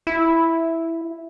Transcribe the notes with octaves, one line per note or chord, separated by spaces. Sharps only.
E4